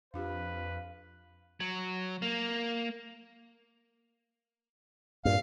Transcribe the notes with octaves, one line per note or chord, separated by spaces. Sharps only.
F2 D4 F4 G4 B4 F5
F#3
A#3
G2 A#2 F5